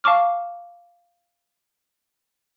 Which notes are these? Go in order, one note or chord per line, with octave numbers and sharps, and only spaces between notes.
F5 A5 C#6 D6 F6